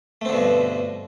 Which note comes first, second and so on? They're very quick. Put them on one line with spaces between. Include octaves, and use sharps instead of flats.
A3 C4 D3 B2 G2